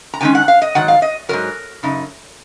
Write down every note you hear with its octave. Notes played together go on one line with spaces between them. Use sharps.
A#5
C3 D#3 G#3 C#4 G#5
F#5
F5
D#5
G#2 D#3 F#3 F#5
F5
D#5
G#2 D#3 F#3 A#4
F#2 C#3 D#4